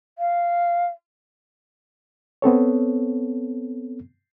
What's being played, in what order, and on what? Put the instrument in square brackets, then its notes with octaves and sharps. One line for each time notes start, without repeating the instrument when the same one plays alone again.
[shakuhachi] F5
[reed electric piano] B3 C4 A4 C#5